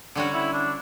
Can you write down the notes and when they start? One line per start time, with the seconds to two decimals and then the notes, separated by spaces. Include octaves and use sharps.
0.15 D3 G3 C#4 F#4
0.34 E4
0.53 D4